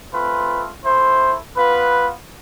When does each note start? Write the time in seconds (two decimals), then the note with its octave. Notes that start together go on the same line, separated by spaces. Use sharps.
0.12 A3 C4 F4 B4
0.84 A3 E4 C5
1.56 B3 F4 B4